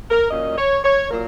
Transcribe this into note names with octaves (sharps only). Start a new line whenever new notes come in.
A#4
A#2 F#3 A#3 C#4 D#5
C#5
C#5
A#2 F#3 A#3 A#4